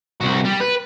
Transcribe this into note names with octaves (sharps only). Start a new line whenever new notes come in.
C2 F#4
G3
B4